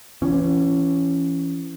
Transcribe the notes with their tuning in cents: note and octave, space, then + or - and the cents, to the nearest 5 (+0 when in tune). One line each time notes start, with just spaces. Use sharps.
E3 +30 C#4 +0